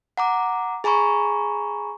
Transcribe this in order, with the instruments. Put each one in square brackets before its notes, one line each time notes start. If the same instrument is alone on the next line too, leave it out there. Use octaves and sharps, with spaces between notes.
[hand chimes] F#5 A#5 D6
G#4 G#5 A#5 B5 C#6